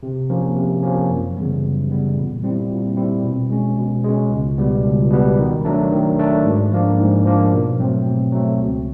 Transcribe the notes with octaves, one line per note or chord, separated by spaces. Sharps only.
C3
F3 A#3 C#4
C3
F3 A#3 C#4
F#2
C#3 E3 G3 B3
F#2
C#3 E3 G3 B3
A#2
G3 C4 E4
A#2
G3 C4 E4
B2
G#3 C#4
B2
G#3 C#4
C#2
B2 G3 B3
C#2
B2 G3 B3
D#3
F#3 A3 D4
D#3
F#3 A3 D4
G#2
F3 A#3 D4
G#2
F3 A#3 D4
B2
F#3 A3 C4
B2
F#3 A3 C4
C#2